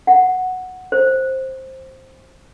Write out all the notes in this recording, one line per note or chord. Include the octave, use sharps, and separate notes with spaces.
F#5
C5